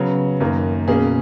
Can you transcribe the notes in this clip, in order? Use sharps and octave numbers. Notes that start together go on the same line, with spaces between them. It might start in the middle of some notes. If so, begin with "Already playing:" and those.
Already playing: C#3 F#3 B3
F#2 D#3 A#3
B2 A#3 C#4 G#4